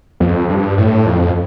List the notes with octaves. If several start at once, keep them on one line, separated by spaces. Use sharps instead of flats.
F2
G2
A2
F2